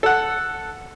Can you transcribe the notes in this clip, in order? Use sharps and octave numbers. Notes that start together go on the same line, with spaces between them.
A4 F#5